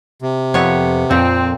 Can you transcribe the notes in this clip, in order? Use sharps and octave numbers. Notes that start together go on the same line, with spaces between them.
C3
F2 B3 C#5
F2 A#2 C4